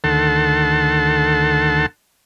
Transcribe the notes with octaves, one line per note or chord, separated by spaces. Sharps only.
D2 D#3 A4 F#5 A5 C6